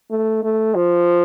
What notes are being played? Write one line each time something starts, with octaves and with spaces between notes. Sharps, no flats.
A3
A3
F3